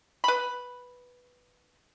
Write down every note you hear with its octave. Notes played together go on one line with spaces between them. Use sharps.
B4 B5